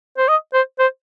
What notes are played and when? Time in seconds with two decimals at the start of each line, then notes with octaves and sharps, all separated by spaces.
0.18 C5
0.28 D#5
0.53 C5
0.79 C5